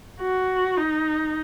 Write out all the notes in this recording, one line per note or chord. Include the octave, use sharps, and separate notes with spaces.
F#4
D#4